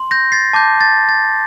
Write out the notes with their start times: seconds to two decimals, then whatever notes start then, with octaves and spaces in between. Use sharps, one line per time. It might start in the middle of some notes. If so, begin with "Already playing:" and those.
Already playing: C6
0.11 G6 A#6
0.32 A6 C7
0.53 A5 D6 G6
0.81 A6
1.09 A6